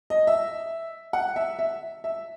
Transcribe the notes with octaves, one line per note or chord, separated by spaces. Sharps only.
D#5
E5
F#5
E5
E5
E5